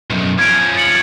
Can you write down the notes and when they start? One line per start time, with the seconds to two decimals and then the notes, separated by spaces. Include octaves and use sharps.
0.10 B1 F#2
0.39 F3 C#4 G#6 D7
0.76 A6 C#7 F#7